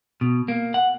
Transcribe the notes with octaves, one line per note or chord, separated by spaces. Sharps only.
B2
A#3
F#5